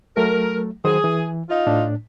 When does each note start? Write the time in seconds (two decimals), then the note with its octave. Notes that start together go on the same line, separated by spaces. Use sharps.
0.17 F#3 A3 A#4
0.85 D#3 F#3 G#4 C5
1.04 E3
1.49 D#4 F4
1.67 A2 D4